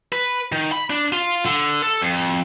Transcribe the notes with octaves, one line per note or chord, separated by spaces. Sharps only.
B4
D#3
B5
D4
F4
D3
A4
F2